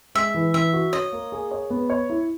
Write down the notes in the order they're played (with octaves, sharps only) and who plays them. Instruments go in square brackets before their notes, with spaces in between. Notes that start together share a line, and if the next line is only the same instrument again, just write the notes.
[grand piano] G#3 [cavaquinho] E5
[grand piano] E3
[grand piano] E3 [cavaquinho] E5
[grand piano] F#4
[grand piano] C#5 [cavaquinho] D#5
[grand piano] A#3
G#4
C#5
B3
C#5
E4